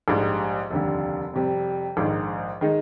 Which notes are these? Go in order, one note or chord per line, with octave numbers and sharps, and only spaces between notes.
A#1 G#2 G3
F1 D#2 D3 G3
F2 C3 G3
A#1 G#2 D#3
D#3 G#3 D#4